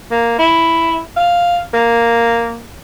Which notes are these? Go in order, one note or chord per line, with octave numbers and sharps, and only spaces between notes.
A#3
E4
F5
A#3